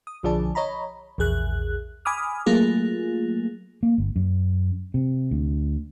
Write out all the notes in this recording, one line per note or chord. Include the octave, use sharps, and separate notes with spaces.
D#6
B1 D3 F3 G#4 D5 A5
C#5 D#5 A#5 B5
A#1 E2 G#4 F#6
G#5 B5 D6 D#6 F6
F#3 A3 A#3 F4 G#4
A#3
G1
F#2
C3
D2